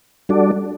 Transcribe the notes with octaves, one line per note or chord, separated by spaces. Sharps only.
G3 D4 F#4 A4 D5